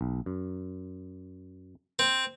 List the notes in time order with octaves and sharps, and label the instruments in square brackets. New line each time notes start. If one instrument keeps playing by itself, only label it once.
[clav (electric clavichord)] B1
F#2
[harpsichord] C4